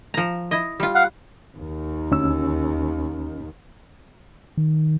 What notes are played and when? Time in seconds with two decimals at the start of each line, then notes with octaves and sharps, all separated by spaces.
0.14 F3 A#5
0.51 E4 D#5
0.80 G3 F4
0.95 F5 F#5
1.57 D#2 D#3
2.11 D2 C#4 E6
4.57 D#3